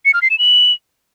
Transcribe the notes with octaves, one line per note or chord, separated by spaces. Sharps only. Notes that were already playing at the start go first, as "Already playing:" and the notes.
C#7
F6
C7
E7
F#7